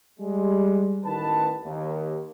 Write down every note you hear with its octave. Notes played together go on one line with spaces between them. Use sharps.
G3 G#3
A1 D#3 B4 A5
D#2